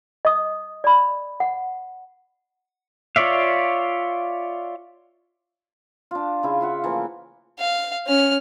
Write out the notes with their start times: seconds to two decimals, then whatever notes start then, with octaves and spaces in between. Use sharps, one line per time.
0.25 D#5 D#6
0.84 D5 B5
1.40 F#5
3.16 F4 C#5 D5 E5 F5
6.11 D4 F4
6.43 C#3 E4
6.61 F4 E5 F#5
6.84 E3 F3 A3 A#3
7.59 F5
8.07 C#4 F6